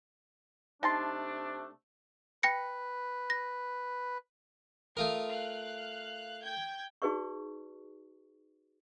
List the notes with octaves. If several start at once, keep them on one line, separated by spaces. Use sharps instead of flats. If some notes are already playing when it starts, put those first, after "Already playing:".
C3 A3 D4 D#4 A5 C6
B4 G5 A#6 C#7
A#6
A3 F4 A#4 D#6
F5 F#6
G5 G6 G#6
D#4 F#4 G#4 B4 D5 C#6